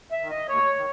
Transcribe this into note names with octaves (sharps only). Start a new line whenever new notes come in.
E5
D#3
D#5
D#2 C#5
D#3